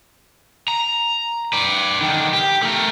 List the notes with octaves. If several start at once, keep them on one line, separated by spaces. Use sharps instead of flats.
A#5
B4 D5
D3 D#3
G4
A3 A#4